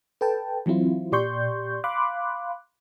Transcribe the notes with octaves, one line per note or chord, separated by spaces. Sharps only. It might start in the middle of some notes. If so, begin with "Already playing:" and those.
A4 B4 G5 A5
E3 F#3 C4 E4 F4
A#2 G4 D5 C6 C#6 G6
F5 B5 C6 D6 F#6